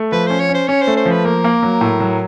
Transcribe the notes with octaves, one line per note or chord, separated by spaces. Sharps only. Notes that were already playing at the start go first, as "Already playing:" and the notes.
Already playing: A3
F3 B4
C#4 C5
C#5
C#4
C5
C#4 C#5
C5
A3
C5
F3
B4
A#3 A#4
A#3
F#3
A2
F#3